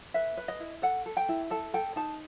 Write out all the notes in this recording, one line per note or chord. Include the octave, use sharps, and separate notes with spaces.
B4 E5
B4
D#5
E4
A4 F#5
A4
G5
E4
A4 A5
A4 G5
D#4 A5